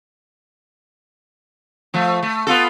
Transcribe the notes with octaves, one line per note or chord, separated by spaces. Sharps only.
F3 A3
A3
B3 F4 A4